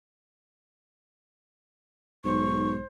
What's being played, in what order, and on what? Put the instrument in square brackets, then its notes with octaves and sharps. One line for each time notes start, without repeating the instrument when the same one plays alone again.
[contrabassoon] B1 [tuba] G#2 [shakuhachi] C5 [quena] C#6